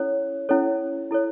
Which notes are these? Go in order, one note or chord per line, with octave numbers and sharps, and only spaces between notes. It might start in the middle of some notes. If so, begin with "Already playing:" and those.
Already playing: C#4 E4 A4 C#5
C#4 E4 A4 C#5
E4 A4 C#5